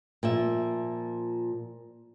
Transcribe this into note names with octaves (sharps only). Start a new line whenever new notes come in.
A#2 F3 E5